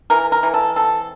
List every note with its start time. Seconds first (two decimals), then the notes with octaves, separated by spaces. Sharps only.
0.10 E3 A#4
0.32 A#4
0.43 E3
0.54 A4
0.76 C4 A4